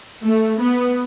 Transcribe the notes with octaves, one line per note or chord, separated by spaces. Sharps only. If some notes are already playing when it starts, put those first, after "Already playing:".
A3
B3